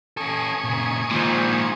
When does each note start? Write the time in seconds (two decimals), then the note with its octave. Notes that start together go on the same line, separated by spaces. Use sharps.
0.17 C#4 A4 G#5 C#6 D#6
0.64 A#2 C#3
1.11 A#2 D#3 F3 G#3